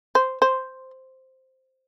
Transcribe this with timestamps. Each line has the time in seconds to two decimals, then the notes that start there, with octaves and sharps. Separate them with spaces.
0.15 C5
0.42 C5